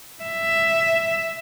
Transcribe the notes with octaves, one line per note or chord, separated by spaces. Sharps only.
E5